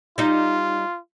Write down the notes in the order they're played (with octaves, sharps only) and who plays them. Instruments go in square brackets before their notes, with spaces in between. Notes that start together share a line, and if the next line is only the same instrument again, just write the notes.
[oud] G3 D#4 [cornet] F4